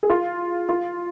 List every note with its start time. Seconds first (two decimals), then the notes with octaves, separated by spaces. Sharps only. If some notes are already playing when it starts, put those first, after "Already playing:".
0.03 G#4
0.10 F4
0.69 F4